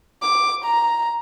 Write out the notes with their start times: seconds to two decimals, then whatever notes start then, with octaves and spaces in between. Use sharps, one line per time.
0.22 D6
0.64 A#5